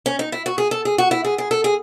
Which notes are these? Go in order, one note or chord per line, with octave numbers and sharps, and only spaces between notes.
C#4
D#4
E4
F#4
G#4
A4
G#4
F#4
E4
G#4
G#4
A4
G#4